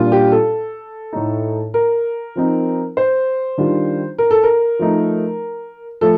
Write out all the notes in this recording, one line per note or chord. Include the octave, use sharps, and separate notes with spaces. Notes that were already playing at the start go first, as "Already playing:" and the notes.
Already playing: A#2 G3 D4 F4
G4
A4
A2 A3 D#4
A#4
F3 C4 D#4
C5
D#3 G3 D4 F4
A#4
A4
A#4
F3 A3 D#4
F3 A3 A4